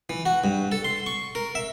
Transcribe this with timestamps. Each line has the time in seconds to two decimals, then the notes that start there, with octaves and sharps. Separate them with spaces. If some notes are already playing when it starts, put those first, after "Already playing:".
0.10 E3
0.26 F#4
0.44 G2
0.72 A4
0.84 C6
1.06 C#6
1.35 A#4
1.55 E5